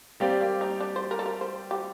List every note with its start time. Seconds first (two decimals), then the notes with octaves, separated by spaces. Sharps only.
0.20 G3 A#3 C4 G4 D5
0.41 A#3
0.61 D#4
0.80 D4
0.96 C5
1.11 A#4
1.19 A4
1.26 A#4
1.41 C5
1.71 G4